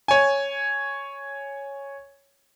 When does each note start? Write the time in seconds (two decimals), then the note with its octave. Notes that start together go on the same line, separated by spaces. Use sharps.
0.08 C#5 G#5